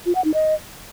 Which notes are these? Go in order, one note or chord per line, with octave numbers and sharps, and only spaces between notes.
F4
F#5
D#4
D#5